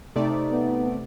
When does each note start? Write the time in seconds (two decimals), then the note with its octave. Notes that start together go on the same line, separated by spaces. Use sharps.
0.16 C3 A3 D#4 D5
0.51 B3